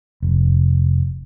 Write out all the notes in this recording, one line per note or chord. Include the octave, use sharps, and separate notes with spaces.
F1